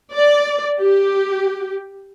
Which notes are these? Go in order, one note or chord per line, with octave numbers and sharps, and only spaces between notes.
D5
G4